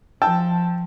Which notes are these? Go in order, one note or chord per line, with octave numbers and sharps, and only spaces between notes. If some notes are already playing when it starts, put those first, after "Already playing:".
F3 G5 A5 E6